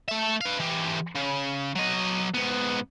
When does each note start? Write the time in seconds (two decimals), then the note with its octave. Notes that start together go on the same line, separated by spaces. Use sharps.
0.08 A3 E5
0.41 B4 F5
0.60 E3 G4
1.15 C#3
1.75 F#3 D#5
2.34 G#2 B3